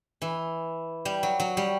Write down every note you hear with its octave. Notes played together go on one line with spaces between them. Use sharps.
E3
G3
F#3
F#3
G3